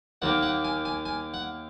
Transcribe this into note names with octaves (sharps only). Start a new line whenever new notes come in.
D#2 D#3 A#3 F#5
F#5
G#5
G#5
G#5
F#5